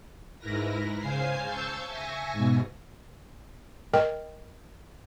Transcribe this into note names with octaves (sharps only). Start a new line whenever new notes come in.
G#2 E4 A#4 B4 A#6
C#3 C5 F5 G#5 C7
A5 C#6 E6 G6 A6
E5 G#5 C#6 A#6
G#2 B2
A#4 D#5 G5